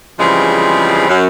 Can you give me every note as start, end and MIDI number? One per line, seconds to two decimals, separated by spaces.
0.19 1.07 49
0.19 1.07 52
0.19 1.07 53
0.19 1.07 55
0.19 1.07 56
0.19 1.07 60
1.09 1.27 42